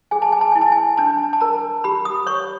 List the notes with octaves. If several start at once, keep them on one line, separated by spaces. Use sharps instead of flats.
G#4 G#5
A5
G#5
A5
E4 G#5
A5
G#5
D4 A5
A5
A#4 A#5
G4 B5
D#6
C#5 C#6